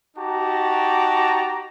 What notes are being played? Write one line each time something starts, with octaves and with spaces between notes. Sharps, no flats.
D#4 F#4 G4 A5 A#5 D6